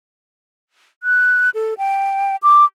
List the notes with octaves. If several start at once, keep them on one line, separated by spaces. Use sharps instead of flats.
F#6
A4
G5
D6